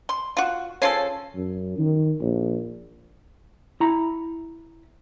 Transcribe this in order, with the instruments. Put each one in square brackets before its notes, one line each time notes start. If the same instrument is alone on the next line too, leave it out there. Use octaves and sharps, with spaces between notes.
[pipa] C6
F4 F#4
[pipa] C#3 F3 A4 [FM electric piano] C#5 G#5 C7
[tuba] F#2
D#3
A#1
[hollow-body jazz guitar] E4 A#5 B5